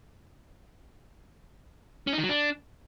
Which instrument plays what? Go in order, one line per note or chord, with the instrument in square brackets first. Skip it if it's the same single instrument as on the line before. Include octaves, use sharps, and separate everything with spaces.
[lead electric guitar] C#4
D#4
D#3
F#3
D4